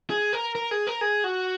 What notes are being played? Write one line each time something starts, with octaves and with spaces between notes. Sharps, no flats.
G#4
A#4
A#4
G#4
A#4
G#4
F#4